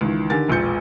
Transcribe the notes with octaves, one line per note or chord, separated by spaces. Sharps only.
C#2 D#3 E3
D3 D#3 G4 A#4 G#5 A6
E1 A#1 A#2 G6 C#7